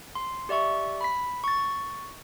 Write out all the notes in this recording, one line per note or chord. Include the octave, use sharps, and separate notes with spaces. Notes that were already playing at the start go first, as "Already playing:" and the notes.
C6
G4 D5 E5 C#6
B5 B6
C#6 A6